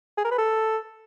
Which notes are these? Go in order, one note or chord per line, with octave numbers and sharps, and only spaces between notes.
G#4
A#4
B4
A4